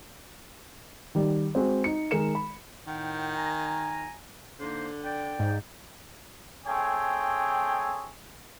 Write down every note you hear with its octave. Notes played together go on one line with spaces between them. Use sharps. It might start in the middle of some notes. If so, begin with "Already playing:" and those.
D#3 G3
G#3 C4 F#4 C5
D#4 C#7
D#3 G#3 A#4 C#7 E7
B5
A2 D#3 F#5 G5
G#5 A#5
D3 A#3 D#4 C5
D5 G5
G#2
A3 C4 G#4 C#5 G5